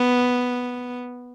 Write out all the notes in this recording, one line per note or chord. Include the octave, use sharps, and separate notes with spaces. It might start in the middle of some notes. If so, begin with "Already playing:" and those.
Already playing: B3